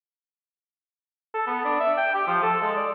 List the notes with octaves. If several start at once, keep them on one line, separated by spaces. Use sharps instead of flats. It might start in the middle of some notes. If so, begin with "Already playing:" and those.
A4
B3
D4
E5
G5
G4
F3
A4
G#3
D5